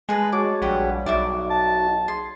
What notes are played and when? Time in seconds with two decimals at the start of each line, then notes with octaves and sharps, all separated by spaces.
0.09 G#3 G#4 B4 A5
0.32 F#4 G#4 C#5 A5 D6
0.62 A#1 G3 G4 B4 F#5
1.06 B1 D#4 F#4 D5 E5 D6
1.50 A5
2.08 G#4 C6